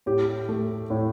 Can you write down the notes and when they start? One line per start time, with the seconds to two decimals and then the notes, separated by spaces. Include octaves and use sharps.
0.06 A2 G4
0.49 A3
0.90 A2